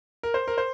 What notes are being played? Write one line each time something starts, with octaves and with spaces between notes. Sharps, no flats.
A#4
C5
A#4
C5